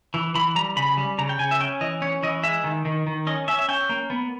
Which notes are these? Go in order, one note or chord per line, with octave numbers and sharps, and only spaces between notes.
E3
E3 B5
G3 A#5
C#3 B5
G3
C#3 A#5
G5
C#3 G#5
E5
C#4 G5
E3 D#5
C#4 C#5
E3 D#5
G#3 E5
D#3
D#3
D#3
C#4 D#5
C#4 E5
E5
C#4 G5
A#3
B3